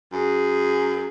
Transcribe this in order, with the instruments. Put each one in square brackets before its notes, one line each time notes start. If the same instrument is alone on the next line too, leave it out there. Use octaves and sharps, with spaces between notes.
[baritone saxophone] F#2 [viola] G#4